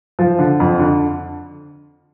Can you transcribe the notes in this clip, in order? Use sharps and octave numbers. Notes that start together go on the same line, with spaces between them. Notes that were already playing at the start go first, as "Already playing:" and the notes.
F3
D3
F2
D3